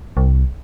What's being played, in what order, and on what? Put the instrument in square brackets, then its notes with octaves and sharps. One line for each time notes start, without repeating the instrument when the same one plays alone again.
[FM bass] C2